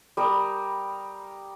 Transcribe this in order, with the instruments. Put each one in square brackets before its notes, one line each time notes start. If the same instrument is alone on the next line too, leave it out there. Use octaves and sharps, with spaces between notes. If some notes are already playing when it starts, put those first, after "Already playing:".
[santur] G3 A#4 D#6